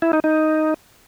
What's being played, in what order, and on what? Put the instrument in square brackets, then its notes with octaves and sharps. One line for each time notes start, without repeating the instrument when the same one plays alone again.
[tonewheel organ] E4
D#4
D#4